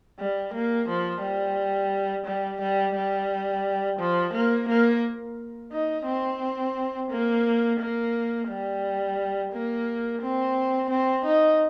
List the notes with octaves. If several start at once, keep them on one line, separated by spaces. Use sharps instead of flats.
G3
A#3
F3
G3
G3
G3
G3
F3
A#3
A#3
D#4
C4
A#3
A#3
G3
A#3
C4
C4
D#4